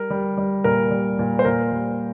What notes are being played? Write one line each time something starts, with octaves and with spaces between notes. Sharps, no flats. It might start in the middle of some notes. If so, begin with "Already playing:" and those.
Already playing: G3 A#4
G3
G3
A#2 A#4
G3
A#2
C5
A#2 A#4
G3